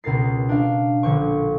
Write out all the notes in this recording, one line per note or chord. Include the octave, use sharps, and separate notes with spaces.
C#2 B2 A#4 A6 C7
D4 F5
A#1 D3 C5 C#6 D6